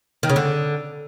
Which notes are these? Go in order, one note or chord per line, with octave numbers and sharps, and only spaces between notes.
D#3
C#3
D3